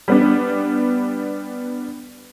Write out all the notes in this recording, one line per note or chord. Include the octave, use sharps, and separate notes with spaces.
G3 B3 D4